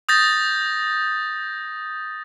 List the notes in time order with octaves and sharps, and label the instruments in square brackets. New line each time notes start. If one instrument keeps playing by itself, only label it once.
[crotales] D#6 G6 A6 A#6